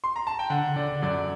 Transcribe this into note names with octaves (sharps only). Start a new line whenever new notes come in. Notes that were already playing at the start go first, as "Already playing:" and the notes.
C6
A#5
A5
G5
D3 F#5
D3 D5
F#2 D5